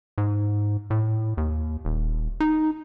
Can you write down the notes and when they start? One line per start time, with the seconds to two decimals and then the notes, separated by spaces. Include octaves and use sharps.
0.18 G#2
0.90 A2
1.37 D#2
1.85 D#1
2.40 D#4